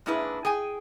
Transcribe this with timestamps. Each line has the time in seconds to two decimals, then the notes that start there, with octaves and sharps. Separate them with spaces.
0.06 G#2 A#3 D4 E4 G#4 B4
0.45 G#4 G5 G#5